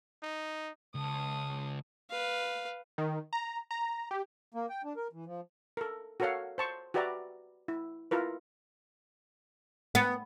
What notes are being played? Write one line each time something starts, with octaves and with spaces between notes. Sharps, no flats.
D#4
C#2 A5 D#6
B4 F5
D#3
A#5
A#5
G4
A#3
G5
D4
A#4
E3
F3
A4 A#4
F#4 A4 A#4 C#5 F5 F#5
C5 A5 C#6
F#4 G4 B4 D5 E5 A#5
E4
E4 F4 A#4 B4
B3